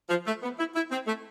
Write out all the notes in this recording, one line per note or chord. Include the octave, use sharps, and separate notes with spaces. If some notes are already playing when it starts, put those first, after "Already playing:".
F3
A3
B3
E4
E4
C4
A3